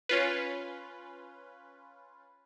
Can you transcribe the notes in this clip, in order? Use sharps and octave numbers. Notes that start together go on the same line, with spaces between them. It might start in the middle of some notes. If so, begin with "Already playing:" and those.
C#4 F4 B4